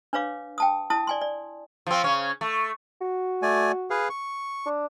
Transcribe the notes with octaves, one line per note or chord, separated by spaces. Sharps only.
D4 B4 C#5 F5 D6
G5 A5 D#6
E4 A5 D#6
D5 G#5 C6
D5
F3 C4
C#3 C#4
A3
F#4
A3 D5 G#5
G#4 B4 F5
C#6
D4